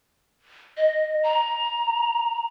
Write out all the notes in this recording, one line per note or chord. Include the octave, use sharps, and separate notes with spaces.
D#5
A#5